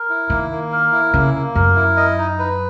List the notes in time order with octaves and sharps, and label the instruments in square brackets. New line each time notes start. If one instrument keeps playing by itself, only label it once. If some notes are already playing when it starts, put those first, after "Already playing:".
Already playing: [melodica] A#4
E4
[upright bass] D#3 [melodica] A#3
[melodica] A#3
A#4
E4
[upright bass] C#3 [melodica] A#3
[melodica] A#3
[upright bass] F#2 [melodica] A#4
[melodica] E4
D#5
D#4
B4